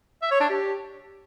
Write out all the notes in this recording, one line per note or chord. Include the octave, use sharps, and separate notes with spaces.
E5
C#5
D4
G4